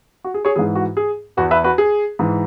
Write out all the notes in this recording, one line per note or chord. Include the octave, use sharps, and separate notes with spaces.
F#4
G#4
G#4 C#5
G#2 E3 G#4
F#4
G#4
E2 E3 F#4 B4
B4 E5
F#4 B4
G#4
G#2 E3